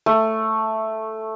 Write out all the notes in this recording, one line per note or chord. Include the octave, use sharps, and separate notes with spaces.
A3